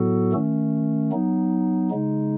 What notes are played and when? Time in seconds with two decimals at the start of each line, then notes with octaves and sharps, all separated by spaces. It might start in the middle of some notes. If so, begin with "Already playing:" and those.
Already playing: A2 F#3 B3 F#4 A4
0.33 D#3 A3 C#4
1.12 F#3 B3 D#4
1.91 C#3 G#3 D#4